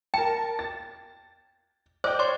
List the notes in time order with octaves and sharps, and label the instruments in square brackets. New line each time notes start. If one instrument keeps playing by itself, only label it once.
[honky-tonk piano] A#4 A5 [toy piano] G5
[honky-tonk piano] A6
[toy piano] C5 [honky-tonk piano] D5 D#5 G5
[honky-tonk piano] C#5 [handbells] D5 C6